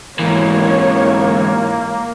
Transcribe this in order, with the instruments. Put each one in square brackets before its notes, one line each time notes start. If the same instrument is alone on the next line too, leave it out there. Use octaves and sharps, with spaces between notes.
[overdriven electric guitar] G#2 E3 [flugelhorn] A#3 [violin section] C#5